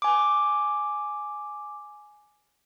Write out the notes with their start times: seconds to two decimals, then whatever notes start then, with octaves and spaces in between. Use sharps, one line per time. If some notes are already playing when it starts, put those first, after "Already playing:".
0.02 G#5 D6